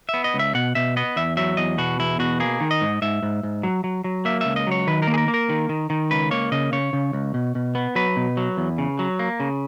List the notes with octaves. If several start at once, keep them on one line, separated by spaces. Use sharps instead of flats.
E5
B3
D#5
C#2
E5
B2 F#5
B2 E5
B3 D#5
E2 E5
F#3 E5
E2 D#5
B2 F#4
E2 E4
B2 F#4
A#3 G#4
D#3
D#5
G#2
G#2 E5
G#2
G#2
F#3
F#3
F#3
A#3 E5
C#2 E5
D#5
F#3 C#5
D#3 B4
A#4
A#3
G#4
A#4
A#3
A#4
D#3
D#3
D#3
C#2 B4
A#3 C#5
C#3 D#5
C#3 C#5
C#3
C#2
B2
B2
B3
F#3 B4
B2
F#3
E2
C#3
F#3
A#3
C#3